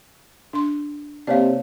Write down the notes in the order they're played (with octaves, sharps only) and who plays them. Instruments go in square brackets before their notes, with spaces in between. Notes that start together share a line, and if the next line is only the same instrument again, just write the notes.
[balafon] D4 C6
[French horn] C3 [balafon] A#3 D5 [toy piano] D#4 C#5 F5